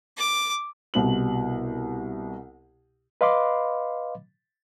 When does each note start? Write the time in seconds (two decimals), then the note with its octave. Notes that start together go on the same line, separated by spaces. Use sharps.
0.17 D6
0.94 C2 B2 F#7
3.21 B4 D#5 F5 B5 C6 D6